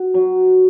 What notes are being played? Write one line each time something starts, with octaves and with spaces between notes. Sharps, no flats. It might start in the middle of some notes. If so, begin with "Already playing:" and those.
Already playing: F#4
F#3